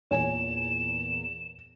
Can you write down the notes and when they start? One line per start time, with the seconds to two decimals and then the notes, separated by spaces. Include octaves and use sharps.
0.11 E2 A#2 C#5 G#5 E7